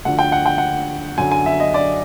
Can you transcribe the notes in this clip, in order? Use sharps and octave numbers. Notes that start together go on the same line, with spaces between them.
D2 D3 F3 F#5
G5
F#5
G5
F#5
F#2 D3 F#3 G#5
G#5
E5
D#5
D5